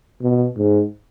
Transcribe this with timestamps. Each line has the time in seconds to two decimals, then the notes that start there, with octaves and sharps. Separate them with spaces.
0.22 B2
0.57 G#2